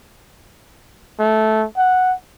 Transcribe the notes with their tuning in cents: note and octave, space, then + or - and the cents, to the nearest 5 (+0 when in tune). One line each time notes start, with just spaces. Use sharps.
A3 -10
F#5 -5